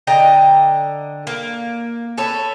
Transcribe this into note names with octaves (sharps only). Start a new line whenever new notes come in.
D3 D#5 G5 A#5
A#3
A4 B4 C#5